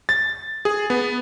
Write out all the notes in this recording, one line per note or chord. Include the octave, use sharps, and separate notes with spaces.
A6
G#4
B3